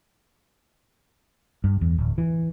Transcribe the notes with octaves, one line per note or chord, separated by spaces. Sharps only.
G2
E2
D1
E3